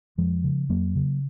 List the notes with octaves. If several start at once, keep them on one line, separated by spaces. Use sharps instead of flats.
F2 F3 G#3
C#3
F2 F#3 A#3
C#3